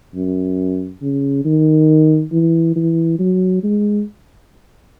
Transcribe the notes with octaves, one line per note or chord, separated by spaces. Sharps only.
F#2
C#3
D#3
E3
E3
F#3
G#3